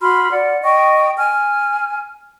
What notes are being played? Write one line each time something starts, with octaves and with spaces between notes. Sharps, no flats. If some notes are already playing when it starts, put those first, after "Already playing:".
F#4 B5 C6 F6
D5 F#5
D#5 G5 C#6
G#5 F6